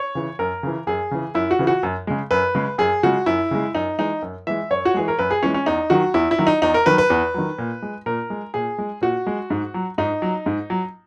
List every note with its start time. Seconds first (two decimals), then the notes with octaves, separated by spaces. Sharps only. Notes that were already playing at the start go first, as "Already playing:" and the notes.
Already playing: C#5
0.15 C#3 E3
0.39 F#2 A#4
0.63 C#3 E3
0.87 F#2 G#4
1.11 C#3 E3
1.35 F#2 E4
1.51 F#4
1.59 C#3 E3
1.67 F#4
1.83 F#2
2.07 C#3 G#3
2.31 F#2 B4
2.55 C#3 G#3
2.78 F#2 G#4
3.03 C#3 G#3 F#4
3.26 F#2 E4
3.51 C#3 G#3
3.75 F#2 D#4
3.99 E3 G#3 D#4
4.22 F#2
4.47 E3 G#3 E5
4.70 F#2 C#5
4.85 F#4
4.94 E3 G#3 G#4
5.08 A#4
5.19 F#2 B4
5.31 G#4
5.43 E3 G#3 C#4
5.54 C#4
5.66 E2 D#4
5.90 D#3 F#3 F#4
6.14 E2 E4
6.31 E4
6.39 D#3 F#3
6.47 D#4
6.62 E2 D#4
6.74 A#4
6.86 D#3 F#3 B4
6.98 B4
7.10 E2
7.34 D#3 F#3
7.58 A#2
7.82 G#3
8.06 A#2 A#4
8.30 G#3
8.54 A#2 G#4
8.78 G#3
9.01 A#2 F#4
9.27 G#3
9.50 G#2
9.74 F#3
9.98 G#2 D#4
10.22 F#3
10.46 G#2
10.70 F#3